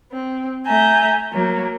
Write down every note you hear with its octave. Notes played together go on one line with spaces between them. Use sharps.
C4
A3 E5 G#5 A#5 G6
F#3 A#3